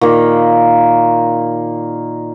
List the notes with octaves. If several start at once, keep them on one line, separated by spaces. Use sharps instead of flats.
A#2 D#3 A#3